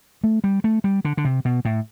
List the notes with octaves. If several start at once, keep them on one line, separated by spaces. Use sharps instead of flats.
A3
G3
A3
G3
D3
D3
C3
B2
A2